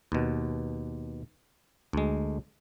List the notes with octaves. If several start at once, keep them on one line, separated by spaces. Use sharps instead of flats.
D#2 B2
D2 G#3